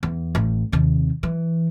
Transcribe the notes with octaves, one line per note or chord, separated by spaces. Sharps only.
E2
A1
D#2 C3
E3